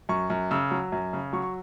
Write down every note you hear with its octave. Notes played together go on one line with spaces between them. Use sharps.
F#2 C#6
F#2
C#3 E6
F#3
F#2
C#3
F#3 C#6
C#6